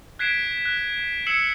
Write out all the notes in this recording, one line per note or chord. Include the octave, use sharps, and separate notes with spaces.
F#6 G#6 B6 C7 D7 E7
F#6
E6 G#6 C7 C#7 E7 F#7